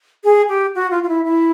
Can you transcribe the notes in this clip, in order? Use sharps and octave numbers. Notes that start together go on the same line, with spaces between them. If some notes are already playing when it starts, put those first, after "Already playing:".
G#4
G4
F#4
F4
F4
E4
E4